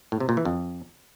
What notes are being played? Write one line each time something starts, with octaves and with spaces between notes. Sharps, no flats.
A2
C3
A#2
E3
F2